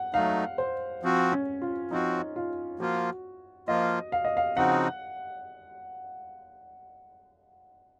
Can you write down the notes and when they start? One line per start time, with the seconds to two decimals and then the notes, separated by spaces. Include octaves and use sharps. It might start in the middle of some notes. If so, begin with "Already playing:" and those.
Already playing: F#5
0.13 F#3 A3 D#4 F5
0.58 C5
1.03 F3 C4 F#4
1.32 C#4
1.62 F4
1.91 F3 C4 D#4 F#4
2.36 F4
2.79 F3 A#3 F4 F#4
3.68 F3 A#3 F4 D#5
4.12 F5
4.24 D#5
4.37 F5
4.57 C#3 F3 C4 D#4 F#4 F#5